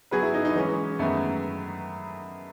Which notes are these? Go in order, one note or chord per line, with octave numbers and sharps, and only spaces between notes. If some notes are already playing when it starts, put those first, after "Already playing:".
F#3 B3 F#4 G#4 B4
E4
D#4
D#4
E3 G#3 B3 C#4
F#2 D#3 G#3 A3 B3